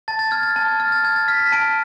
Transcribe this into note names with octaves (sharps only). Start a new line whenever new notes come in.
A5 A6
A6
F6 G#6
A6
A5 A6
G#6
F6 A6
A6
A5 G#6
A6
F6 B6
B6
A5 D7